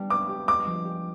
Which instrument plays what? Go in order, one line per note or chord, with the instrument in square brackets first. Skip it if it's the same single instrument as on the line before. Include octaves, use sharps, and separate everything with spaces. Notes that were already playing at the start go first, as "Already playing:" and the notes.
Already playing: [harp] G3 B3 D4 G4
[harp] B4 [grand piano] D6
[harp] G4
[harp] G#3 [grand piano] D6
[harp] F3
G4